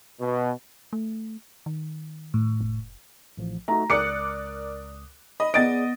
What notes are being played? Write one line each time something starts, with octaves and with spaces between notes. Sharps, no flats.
B2
A3
D#3
A2
F1
A1 F3
A3 D#4 F#4 A#5
C#2 A#4 D5 D6 D#6 F#6 C#7
D#5 B5
B3 G#4 D5 D#5 A6 D7